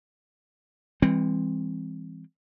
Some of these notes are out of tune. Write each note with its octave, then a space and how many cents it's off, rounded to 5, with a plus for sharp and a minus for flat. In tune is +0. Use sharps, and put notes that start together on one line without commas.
E3 +0 G#3 -45 C4 +0